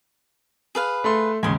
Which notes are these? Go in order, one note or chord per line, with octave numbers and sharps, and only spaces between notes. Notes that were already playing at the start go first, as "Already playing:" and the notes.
G#4 B4 F5
A3 A4 C6
D#2 G#2 C#3 G#5 C6